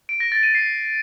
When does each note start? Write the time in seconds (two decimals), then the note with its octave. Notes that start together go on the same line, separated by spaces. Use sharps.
0.09 D7
0.20 A#6
0.32 A6
0.43 D#7
0.55 C7